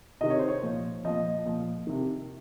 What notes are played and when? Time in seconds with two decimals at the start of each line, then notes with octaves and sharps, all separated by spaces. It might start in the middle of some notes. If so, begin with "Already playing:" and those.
0.21 C3 D#3 D#5
0.30 C#5
0.39 C5
0.48 C#5
0.63 A#2 F3
1.05 A#2 F3 D#5
1.46 A#2 F3
1.87 C3 D#3